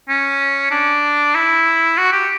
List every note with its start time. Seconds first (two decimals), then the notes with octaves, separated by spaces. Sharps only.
0.09 C#4
0.71 D4
1.35 E4
1.98 F#4
2.13 G4